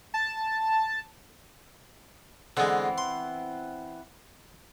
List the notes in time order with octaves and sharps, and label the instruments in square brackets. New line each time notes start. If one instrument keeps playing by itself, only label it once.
[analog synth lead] A5
[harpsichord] D3 G#3 [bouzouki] E3 B3 C4
[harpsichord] C6